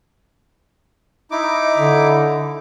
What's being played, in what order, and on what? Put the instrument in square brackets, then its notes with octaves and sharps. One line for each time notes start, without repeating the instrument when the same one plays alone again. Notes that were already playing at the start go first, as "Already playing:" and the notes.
[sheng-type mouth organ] D#4 E4 D6
[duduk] D3